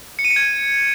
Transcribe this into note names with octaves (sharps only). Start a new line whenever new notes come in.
C#7
D#7
C#7
G#6